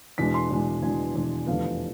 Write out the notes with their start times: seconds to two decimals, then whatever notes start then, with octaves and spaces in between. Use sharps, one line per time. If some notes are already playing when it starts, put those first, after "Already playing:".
0.18 E2 B2 G#3 D4 B6
0.34 C6
0.50 E2 B2 G#3 D4
0.82 E2 B2 G#3 D4 G#5
1.15 E2 B2 G#3 D4
1.47 F1 E2 D3 F3 B3 F5